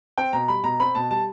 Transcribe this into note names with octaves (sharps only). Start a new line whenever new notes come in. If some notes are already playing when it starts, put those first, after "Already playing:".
C4 G5
B2 A#5
G3 B5
B2 A#5
C4 B5
B2 A5
G3 A5